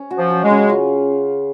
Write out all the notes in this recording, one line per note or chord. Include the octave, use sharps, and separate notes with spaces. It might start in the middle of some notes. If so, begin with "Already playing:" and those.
Already playing: C#4
F#4
F3
F#3
G#3
C#3
F4